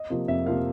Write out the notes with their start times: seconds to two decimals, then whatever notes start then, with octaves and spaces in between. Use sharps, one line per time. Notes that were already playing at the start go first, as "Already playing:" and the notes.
Already playing: D#5
0.10 C3 F3 A#3
0.28 F2 E5
0.46 C3 F3 A#3 F5